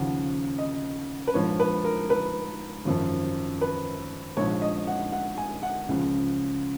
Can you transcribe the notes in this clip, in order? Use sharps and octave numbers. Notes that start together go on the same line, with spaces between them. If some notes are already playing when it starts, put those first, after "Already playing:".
Already playing: D#2 C#3 F3 F#5
D#5
B4
A#1 G#2 F3 C#5
B4
A#4
B4
G#1 F#2 F3
B4
A#1 G#2 F3 C#5
D#5
F#5
F#5
G#5
F#5
C#2 C#3 F3